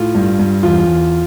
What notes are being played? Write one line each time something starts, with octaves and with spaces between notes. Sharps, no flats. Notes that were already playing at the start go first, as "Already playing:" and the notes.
Already playing: A2 F4
G2
G2
E2 F4
E2